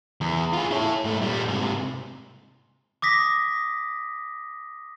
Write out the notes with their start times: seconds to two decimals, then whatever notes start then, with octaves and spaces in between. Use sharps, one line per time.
0.21 E2
0.53 F4 G#4
0.71 E4 C#5
1.04 G#2 A3
1.22 A#2 G3
1.48 G#2 C3
3.02 D6 D#6 A#6 B6